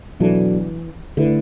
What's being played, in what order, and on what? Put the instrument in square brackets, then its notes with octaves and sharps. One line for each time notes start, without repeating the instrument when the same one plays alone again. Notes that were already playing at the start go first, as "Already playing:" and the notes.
[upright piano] B2 F#3 D4 A4 [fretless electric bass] E3
[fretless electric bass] D3 [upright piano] A3 E4 B4